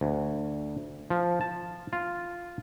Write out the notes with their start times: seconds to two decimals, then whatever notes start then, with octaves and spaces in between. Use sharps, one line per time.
0.01 D2
1.10 F3
1.41 A5
1.93 F4